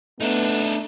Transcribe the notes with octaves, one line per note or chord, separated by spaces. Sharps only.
A3 B3 D4 D#4